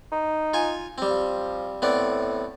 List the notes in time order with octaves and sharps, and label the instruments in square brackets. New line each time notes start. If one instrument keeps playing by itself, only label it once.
[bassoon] D#4
[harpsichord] F4 G#5
G3 C4
[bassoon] F3
[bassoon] A2 [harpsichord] B3 C4 D5